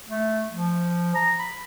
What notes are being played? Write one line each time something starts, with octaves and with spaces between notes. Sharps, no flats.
A3
F3
A#5
B5